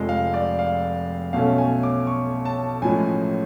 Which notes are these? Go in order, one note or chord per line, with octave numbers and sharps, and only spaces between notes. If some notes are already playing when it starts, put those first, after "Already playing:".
Already playing: F1 F2 F3 G#3
F5
D5
F5
B1 B2 A3 C#4 F5
G#5
D6
C#6
A5
A1 A2 F3 G#3 G#5